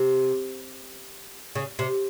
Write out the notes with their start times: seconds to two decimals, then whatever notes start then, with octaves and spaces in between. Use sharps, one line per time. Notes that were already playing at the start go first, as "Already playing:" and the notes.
Already playing: C3
1.55 C#3
1.79 C3